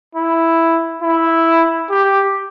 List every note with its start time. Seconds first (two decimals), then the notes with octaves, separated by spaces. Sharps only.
0.15 E4
1.02 E4
1.90 G4